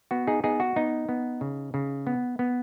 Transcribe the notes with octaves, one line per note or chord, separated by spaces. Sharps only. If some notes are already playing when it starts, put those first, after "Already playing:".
B3 F#4
D#4 G#4
B3 D#4 G#4
F#4
B3 D#4
B3
C#3
C#3
B3
B3